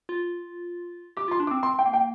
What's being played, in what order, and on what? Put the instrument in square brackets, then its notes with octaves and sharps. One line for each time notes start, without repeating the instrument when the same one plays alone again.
[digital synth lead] F4
[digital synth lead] G4 [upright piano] D6
[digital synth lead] F4 [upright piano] C6
[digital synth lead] D4
[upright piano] D6
[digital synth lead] C4
[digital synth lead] C4 [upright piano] C6
[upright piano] G5
[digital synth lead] A#3
[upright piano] G5